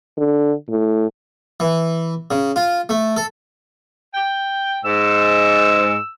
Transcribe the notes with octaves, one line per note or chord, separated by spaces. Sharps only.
D3
A2
E3
C#3
F4
A3
A4
G5
G#2 E6